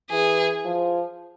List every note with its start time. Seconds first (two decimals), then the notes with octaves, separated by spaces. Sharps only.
0.10 E3 G#4
0.65 F3